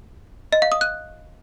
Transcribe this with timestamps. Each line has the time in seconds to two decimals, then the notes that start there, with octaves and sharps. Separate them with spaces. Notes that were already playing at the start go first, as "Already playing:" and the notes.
0.52 D#5
0.62 F5
0.72 D#6
0.81 F#6